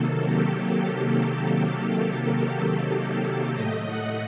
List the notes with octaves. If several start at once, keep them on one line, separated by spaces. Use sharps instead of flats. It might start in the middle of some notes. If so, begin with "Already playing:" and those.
Already playing: C3 D#3 F#3 A#3 A4
G4
G4
A2 A3 D#5
F#5